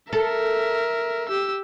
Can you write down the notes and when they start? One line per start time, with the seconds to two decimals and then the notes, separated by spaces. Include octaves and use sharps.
0.13 A4 A#4 E5
1.29 G4 E6